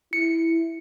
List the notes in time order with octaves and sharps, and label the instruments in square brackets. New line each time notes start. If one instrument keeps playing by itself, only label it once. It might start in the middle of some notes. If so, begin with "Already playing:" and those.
[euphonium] E4 [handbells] C#7